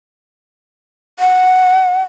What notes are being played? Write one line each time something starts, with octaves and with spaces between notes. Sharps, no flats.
F#5